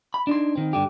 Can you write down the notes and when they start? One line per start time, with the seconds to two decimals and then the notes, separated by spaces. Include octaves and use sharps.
0.14 B5
0.27 D4 D#4 C6
0.56 D#3 C4
0.73 G2 D3 G4